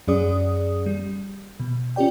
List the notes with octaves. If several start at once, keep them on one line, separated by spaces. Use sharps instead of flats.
F#2 F#3 C#4 G#4 D5 D#6
G3
B2
C#4 F4 G4 D5 G5